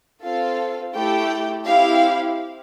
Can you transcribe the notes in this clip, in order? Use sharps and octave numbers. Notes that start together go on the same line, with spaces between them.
C4 F4 A4 F5
A3 E4 G4 G5
C4 E4 G4 F5